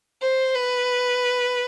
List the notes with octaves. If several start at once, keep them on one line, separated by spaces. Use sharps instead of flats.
C5
B4